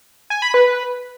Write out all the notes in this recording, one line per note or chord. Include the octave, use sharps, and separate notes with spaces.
G#5
B5
B4